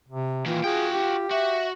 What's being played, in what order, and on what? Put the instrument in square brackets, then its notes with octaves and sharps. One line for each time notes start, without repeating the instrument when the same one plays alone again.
[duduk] C3
[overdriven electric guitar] A#2 D#3 [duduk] E3 [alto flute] F4
[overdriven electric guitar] F#4 G5 [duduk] G#4
[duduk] G4
[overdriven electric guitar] F#4 [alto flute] E5